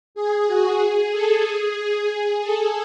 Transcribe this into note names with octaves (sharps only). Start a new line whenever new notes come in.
G#4
F#4
G#4
A4
G#4
G#4
A4